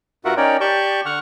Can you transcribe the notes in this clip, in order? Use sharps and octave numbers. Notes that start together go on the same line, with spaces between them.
G2 F4 F#4 A#4 E5 F#5
C#4 D#4 A#4 C#5 D5 G5
G4 D5 A5 C#6 G6
D3 F#5 C#6 F6